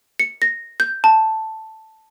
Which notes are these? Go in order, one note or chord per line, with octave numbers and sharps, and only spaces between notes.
C#7
A#6
G6
A5